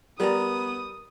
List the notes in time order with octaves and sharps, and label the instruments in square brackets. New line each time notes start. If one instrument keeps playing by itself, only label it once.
[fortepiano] G3 [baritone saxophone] B3 [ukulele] A#4 D5 A#5 [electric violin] D#6